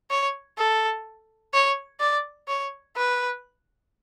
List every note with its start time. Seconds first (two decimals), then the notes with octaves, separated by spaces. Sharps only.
0.10 C#5
0.58 A4
1.53 C#5
2.00 D5
2.48 C#5
2.97 B4